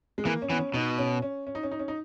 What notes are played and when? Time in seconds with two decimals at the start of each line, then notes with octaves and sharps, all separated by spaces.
0.18 G#3
0.25 E3 A#3
0.42 C#4
0.50 E3 B3
0.58 C#4
0.74 B2 D#4
0.98 C#4
1.22 C#4
1.47 C#4
1.55 D#4
1.63 C#4
1.71 D#4
1.79 C#4
1.88 D#4